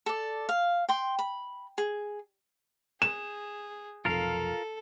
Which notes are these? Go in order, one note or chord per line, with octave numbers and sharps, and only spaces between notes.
A4 D5
F5
G5 C6
B5
G#4
G#4 E7
F1 B1 F2 F4 A4 A#4 F5